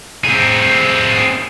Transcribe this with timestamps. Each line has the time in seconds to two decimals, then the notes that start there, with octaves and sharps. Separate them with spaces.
0.25 C4 G#4